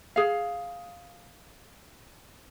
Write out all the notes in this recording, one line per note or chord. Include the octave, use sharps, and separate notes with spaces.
G#4 F5